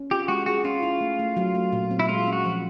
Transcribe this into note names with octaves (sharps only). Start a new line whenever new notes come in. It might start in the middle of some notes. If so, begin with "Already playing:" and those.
Already playing: C#4
F4 G4
G#3 F#4
F#4 G#4
C#4 F4
E4
A3
A3
F#3
A3
A#2
C4
E4
G#3 F4
C#4
F#4
F3